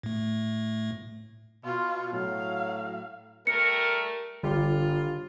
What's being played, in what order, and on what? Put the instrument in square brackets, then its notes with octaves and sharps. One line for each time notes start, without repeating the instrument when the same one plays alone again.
[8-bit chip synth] A2 A3
[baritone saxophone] B2 [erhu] F4
[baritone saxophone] A2 [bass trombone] F#3 [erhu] F5
[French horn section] G3 A3 A#4 [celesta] C#7
[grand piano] G1 G4 [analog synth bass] D3 [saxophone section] F4